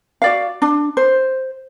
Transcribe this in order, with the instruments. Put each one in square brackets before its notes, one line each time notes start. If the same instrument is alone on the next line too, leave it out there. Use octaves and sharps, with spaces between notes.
[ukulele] F#4 D5 F5
D4
C5